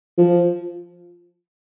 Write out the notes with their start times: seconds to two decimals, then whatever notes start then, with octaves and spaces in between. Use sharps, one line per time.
0.18 F3